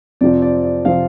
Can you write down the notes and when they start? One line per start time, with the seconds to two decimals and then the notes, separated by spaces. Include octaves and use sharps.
0.21 F2 C3 F3 C4 D5
0.42 D5
0.64 D5
0.85 C3 F3 C4 F5